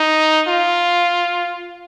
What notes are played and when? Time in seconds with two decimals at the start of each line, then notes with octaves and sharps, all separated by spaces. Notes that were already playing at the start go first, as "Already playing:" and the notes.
Already playing: D#4
0.48 F4